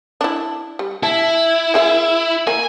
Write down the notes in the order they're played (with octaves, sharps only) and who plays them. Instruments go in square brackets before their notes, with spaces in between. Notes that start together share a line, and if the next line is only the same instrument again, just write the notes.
[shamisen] D4 E4
G3
[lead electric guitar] E4 [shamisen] A5
[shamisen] A#3 G#4 E5
[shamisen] A#3 [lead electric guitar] G#5